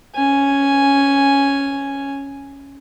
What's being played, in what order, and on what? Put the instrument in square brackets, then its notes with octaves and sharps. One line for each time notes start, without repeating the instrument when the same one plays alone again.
[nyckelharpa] C#4 G#5